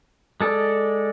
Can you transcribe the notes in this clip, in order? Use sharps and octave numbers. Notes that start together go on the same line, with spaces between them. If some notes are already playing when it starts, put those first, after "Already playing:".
G#3 A4 D5